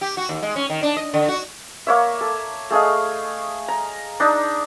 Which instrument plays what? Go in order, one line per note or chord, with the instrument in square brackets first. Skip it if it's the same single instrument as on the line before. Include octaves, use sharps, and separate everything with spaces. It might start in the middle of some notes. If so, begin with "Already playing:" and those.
[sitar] G4
F#4
D#2
G#3
C#4
D#3
D4
D#5
D3
F#4
[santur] A#3 C#5 E5
A4
A3 G#4 D#5 F5
A#5
D4 D#4